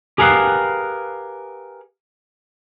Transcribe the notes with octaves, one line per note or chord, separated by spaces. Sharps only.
G4 G#4 A#4 B4 F5 F#5